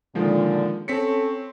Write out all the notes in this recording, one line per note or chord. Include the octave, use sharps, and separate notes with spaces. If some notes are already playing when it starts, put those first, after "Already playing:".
A#2 D3 D#3 F3 G#3
C4 C#4 A4 C#5 B6 C#7